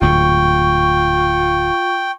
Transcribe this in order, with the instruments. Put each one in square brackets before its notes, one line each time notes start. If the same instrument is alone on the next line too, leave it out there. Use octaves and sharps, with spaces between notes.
[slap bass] D1 D2 G#2 [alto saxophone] F4 [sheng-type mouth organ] G5 [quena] C#6